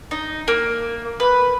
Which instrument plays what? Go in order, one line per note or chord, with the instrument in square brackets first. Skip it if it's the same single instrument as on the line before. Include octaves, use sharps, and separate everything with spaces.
[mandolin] D#4
A#3
B4